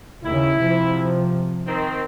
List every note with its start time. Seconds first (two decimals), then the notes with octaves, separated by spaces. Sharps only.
0.24 D#2 C#3 E4
0.59 C3 F3
1.67 D#3 C4